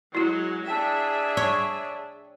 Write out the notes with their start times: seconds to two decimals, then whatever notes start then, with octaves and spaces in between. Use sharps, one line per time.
0.15 F#3 G#3 E4 F#4
0.67 D4 G#4 E5 G5 A5
1.37 C#5